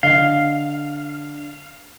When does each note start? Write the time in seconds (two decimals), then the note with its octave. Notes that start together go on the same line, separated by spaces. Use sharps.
0.03 D3 D#5 F5 G7